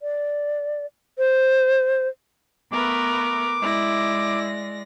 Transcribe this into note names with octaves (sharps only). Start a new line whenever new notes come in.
D5
C5
A3 B3 A#4 B4 D6
G#3 E4 D5 A#6